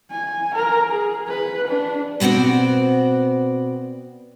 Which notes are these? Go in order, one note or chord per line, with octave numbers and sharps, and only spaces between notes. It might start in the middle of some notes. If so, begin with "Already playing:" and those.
G#5
A#4
G#4
B4
D4
B2 B3 C4 F#4 D5